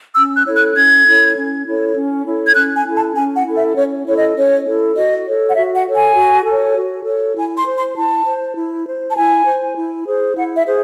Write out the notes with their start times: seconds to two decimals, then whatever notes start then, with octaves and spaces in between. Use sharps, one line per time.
0.16 C#4 E6
0.37 F#6
0.47 E4 A4 C#5
0.56 F#6
0.76 C#4 G#6
1.07 E4 A4 C#5
1.36 C#4
1.66 E4 A4 C#5
1.96 C#4
2.27 E4 A4 C#5
2.47 G#6
2.56 C#4 F#6
2.76 G#5
2.86 E4 A4
2.96 A5
3.16 C#4 G#5
3.36 F#5
3.46 E4 A4
3.56 E5
3.76 C#4 C#5
4.05 E4 A4 C#5
4.15 D#5
4.36 C#4 C#5
4.65 E4 A4
4.95 F#4 D#5
5.26 A4 C#5
5.49 F#5
5.56 F#4 E5
5.76 F#5
5.86 A4 C#5
5.96 G#5
6.16 F#4
6.45 A4 C#5
6.76 F#4
7.05 A4 C#5
7.35 E4 G#5
7.56 C6
7.66 C5
7.75 C6
7.95 E4 A5
8.26 C5
8.56 E4
8.86 C5
9.10 A5
9.15 E4 G#5
9.46 C5
9.75 E4
10.06 G#4 C5
10.35 E4 F#5
10.55 E5
10.65 G#4 C5